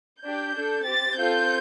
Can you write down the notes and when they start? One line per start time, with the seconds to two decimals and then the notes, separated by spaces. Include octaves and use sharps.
0.22 D4 G4 G6
0.55 D4 A4
0.86 C4 G4 A6
1.18 C4 F4 A4 G6